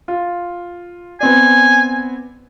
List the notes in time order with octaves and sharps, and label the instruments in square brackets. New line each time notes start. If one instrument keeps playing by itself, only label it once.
[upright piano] F4
[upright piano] B3 C4 D5 [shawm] G#5